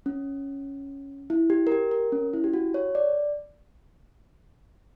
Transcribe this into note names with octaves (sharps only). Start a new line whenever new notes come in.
C#4
E4
G4
A#4
G4
A#4
C#4
E4
G4
F#4
C#5
D5